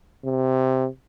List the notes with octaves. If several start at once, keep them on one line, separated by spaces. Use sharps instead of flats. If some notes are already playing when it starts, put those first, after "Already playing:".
C3